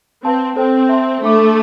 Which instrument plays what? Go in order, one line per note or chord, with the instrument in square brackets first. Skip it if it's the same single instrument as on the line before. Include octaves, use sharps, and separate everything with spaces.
[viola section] C4 [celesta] B4 F5 A5 C6
[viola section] C4 [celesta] A4 C5 G5
[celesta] C5 E5 A5 C6
[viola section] A3 [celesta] D4 A4 E5 B5 D6